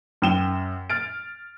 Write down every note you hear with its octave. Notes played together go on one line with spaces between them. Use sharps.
F#2 G5 E7 G7
F6 A6 D7